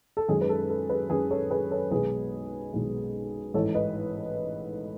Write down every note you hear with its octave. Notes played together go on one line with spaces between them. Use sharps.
A4
F#2 D#3 G#3 C#4 G#4
B4
A4
A4
G#4 B4
F#2 D#3 G#3 C#4 G#4 B4
A4 C#5
G#4 B4
A4 C#5
B1 B2 G#3 B3 G#4 B4
B1 B2 G#3 B3
A1 G#2 E3 A4 C#5
B4 D#5